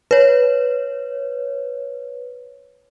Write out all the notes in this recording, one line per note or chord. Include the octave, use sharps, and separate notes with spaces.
B4 C#5